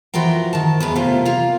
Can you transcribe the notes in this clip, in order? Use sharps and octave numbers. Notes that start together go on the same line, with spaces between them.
E3 F3 F#4 A#4 G5
D#3 A5
E2 G#3 B3
C3 A3 A#3 F4
A#3 F4